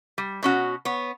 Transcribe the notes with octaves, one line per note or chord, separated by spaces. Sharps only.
G3
B2 C#4 F#4
B3 C#5